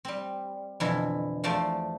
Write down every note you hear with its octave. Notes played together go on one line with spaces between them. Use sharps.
G3 C4
F2 B2 D3 E3 E4
E2 F3 A3 C5 D5 F5